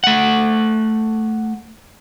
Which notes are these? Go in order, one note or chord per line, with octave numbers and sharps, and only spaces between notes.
A3 F#5